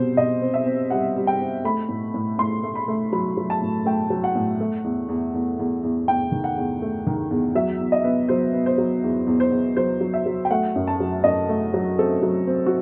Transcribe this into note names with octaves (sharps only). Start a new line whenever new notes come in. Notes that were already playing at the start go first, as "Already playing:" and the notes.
Already playing: B2 G3 C4 C5
B2 D#5
C4
E5
C4
G3 F#5
G3
G5
C4
A3 B5
A2
A2
A2 C6
A3
B5
A3
F#3 B5
F#3
A5
A2
A3 G5
F#3
F#5
A2
A3
E2
E2
E2
E2
E2
E2 G5
D#3
F#5
E2
A3
D#3
E2
F#3 E5
E2
D#5
B3
F#3 C5
B3
C5
F#3
E2
E2
C5
E2
F#3 C5
F#3
E5
F#3
G5
A3 F#5
F#2
A5
F#3
F#2 D#5
A3
F#3
C4 A4
F#3
C4
F#4